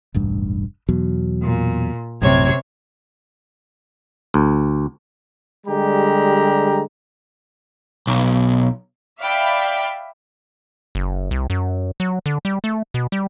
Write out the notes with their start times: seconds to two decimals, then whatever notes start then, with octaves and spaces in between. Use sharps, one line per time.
0.14 E1 A1 G2
0.89 E2 B2 F#3
1.41 A#2
2.22 A#1 F#2 A2 C3 C#5 G#6
4.34 D2
5.67 D3 G3 G#3 G4 A#5
8.07 B1
9.20 D5 E5 F5 G5 B5
10.95 F#1
11.31 C2
11.50 F#2
12.00 F#3
12.26 D3
12.45 G3
12.64 A3
12.94 B2
13.12 G3